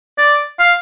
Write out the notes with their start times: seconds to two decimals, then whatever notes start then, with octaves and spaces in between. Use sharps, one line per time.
0.18 D5
0.60 F5